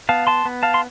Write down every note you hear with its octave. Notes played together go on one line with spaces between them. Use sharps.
B3 F5 A5
A5 C6
B3
F5 A5
C6